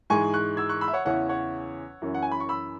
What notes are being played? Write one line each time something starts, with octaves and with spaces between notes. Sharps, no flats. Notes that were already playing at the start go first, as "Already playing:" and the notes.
G#2 E3 G#3 G#5 C#6
C#6 F#6
E6 G#6
C#6 F#6
B5 E6
E5
C#5 F#5
E2 C#3 E3 C#4 E4 C#5 F#5
C#5 F#5
F#2 E3 C#4
F#5
G#5
B5
C#6
B5 E6